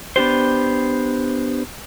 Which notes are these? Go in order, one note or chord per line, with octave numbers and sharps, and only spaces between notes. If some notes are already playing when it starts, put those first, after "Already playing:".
B3 D4 G4 C5